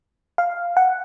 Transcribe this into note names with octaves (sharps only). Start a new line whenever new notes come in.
F5
F#5